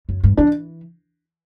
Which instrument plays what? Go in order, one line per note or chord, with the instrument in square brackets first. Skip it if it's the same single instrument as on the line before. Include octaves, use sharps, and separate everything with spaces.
[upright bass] F#2
G2
[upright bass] E3 [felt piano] D4